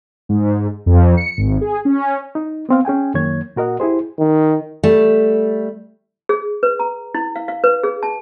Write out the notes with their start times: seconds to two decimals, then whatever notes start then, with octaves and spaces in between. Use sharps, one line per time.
0.29 G#2
0.86 F2
1.17 C#7
1.38 G#1
1.61 G#4
1.85 C#4
2.35 D#4
2.69 B3 C4 F5
2.85 C#4 G#4 G5 G#5
3.14 F#2 D#3 A#3 C#5 G#6
3.56 A#2 F#4 A#4 D#5 F#5
3.80 E4 G4 G#4 C5
4.19 D#3
4.83 G3 A3
6.29 G#4
6.63 B4
6.79 A#5
7.15 E4
7.36 F5
7.48 F5
7.64 B4
7.83 G#4
8.03 A5